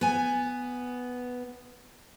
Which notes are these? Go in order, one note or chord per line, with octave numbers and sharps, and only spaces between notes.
B3 G#5